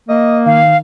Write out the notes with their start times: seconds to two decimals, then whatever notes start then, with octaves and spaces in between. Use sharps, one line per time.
0.09 A#3 D#5
0.46 D#3 F5